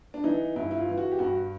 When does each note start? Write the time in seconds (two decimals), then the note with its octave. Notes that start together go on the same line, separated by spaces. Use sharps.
0.14 D4
0.24 E3 D#4
0.56 G2 E4
0.71 E4
0.77 F4
0.88 E3
0.98 F#4
1.12 G4
1.19 G2 F#4